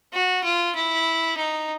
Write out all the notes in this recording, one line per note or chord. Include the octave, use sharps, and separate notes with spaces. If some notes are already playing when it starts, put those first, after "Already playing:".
F#4
F4
E4
D#4